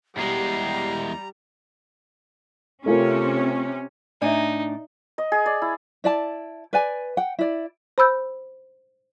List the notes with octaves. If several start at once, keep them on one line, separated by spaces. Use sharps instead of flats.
E2 G3 G#3 A#5 C7
C3 A3 C#4 F4 A#4
A2 D4 D#4 D5 E5 G#5
D#5
G#4
D5
E4
E4 D5 A5
B4 D5 G#5
F#5 G5
E4 D5
C5 B5 E6 G6